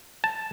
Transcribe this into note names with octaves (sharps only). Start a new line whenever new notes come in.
A5